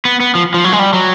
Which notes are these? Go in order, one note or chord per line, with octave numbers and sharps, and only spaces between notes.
B3
B3
F3
F3
F#3
G#3
G3
F#3